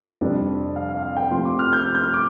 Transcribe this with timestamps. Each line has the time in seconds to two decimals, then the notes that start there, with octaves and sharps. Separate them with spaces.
0.21 F2 C3 G3 D4
0.76 F5
0.89 F5
1.03 F5
1.17 G5
1.31 C3 F3 A3 C4 C6
1.45 D6
1.59 F6
1.73 G6
1.86 F6
1.95 G6
2.03 F6
2.14 D6